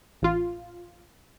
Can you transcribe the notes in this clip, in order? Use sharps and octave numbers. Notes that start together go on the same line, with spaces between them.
A1 F4